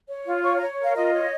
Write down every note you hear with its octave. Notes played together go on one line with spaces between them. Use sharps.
C#5
F4
C#5 C#6
C#5 A#5
A#4
F5
F4 D#5
C#5